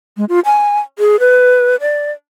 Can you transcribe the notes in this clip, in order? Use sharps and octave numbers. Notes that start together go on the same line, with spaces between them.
G#3
F4
G#5
G#4
B4
D5